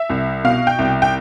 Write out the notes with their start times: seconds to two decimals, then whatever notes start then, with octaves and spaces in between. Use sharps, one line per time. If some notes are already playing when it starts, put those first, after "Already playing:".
Already playing: E5
0.09 C2
0.44 B2 F5
0.67 G5
0.79 C2
1.02 G5